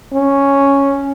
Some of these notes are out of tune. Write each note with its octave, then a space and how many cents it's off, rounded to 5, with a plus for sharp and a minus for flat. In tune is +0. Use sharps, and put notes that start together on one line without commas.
C#4 +0